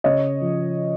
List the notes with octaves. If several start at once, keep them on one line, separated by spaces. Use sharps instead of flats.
C#3 C#5 D#5
F3